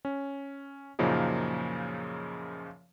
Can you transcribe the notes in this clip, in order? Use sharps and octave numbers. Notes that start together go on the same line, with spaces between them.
C#4
F#2 A#2 C#3 F3 A#3 D#4